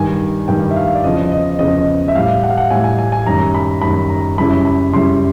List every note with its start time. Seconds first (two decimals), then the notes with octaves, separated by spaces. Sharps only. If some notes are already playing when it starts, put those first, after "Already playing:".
Already playing: G2 D#3 G3 G#5
0.48 G2 D#3 G3 G5
0.71 E5
0.76 F5
0.95 D5
1.04 E2 C#3 F3 D#5
1.32 D#5
1.59 E2 C#3 F3 D#5
2.08 E5
2.15 A2 E3 G3 F5
2.44 F#5
2.50 F5
2.58 F#5
2.70 A2 E3 G3 G#5
2.84 G#5
2.99 G#5
3.12 G#5
3.26 F#2 D#3 G3 A#5
3.54 B5
3.82 F#2 D#3 G3 B5
4.09 A#5
4.37 F#2 C#3 E3 G3 B5
4.65 B5
4.93 F#2 C#3 E3 G3 C6